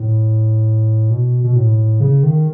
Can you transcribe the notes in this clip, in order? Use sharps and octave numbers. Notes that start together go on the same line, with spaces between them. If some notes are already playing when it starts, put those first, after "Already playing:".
Already playing: A2
B2
B2
A2
C#3
D#3